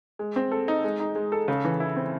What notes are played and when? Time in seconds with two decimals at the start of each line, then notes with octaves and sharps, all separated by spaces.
0.19 G#3
0.36 C4
0.52 A4
0.68 D#4
0.84 G#3
1.00 D#4
1.15 G#3
1.32 A4
1.48 C#3
1.65 E3
1.80 E4
1.96 C4